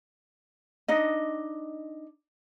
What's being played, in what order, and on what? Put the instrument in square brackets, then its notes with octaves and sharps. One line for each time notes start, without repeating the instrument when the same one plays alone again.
[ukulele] D4 D#4 D#5